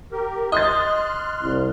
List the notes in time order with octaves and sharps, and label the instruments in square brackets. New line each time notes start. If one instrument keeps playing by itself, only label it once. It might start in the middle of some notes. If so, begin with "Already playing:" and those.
[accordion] G4 A#4
[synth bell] D#5 [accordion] C6 F6 F#6 [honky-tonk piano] D#6 A6
[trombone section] C2